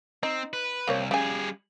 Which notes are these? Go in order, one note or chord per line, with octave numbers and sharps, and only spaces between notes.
C4 D#4
B4
C2 A#3 C4 C#5
C#3 G3 G#4 G#5